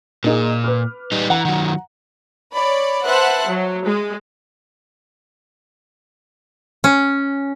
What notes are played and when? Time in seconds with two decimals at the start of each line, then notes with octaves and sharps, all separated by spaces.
0.24 A#2 A#3 D#4 G#4
0.64 B4 D6 F6
1.12 G3 D#4
1.30 E3 F#5 A#5
1.45 D#3 F#3
2.52 C#5 D5 B5
3.05 B4 C5 E5 F#5 A5 F#6
3.46 F#3
3.86 G#3
6.84 C#4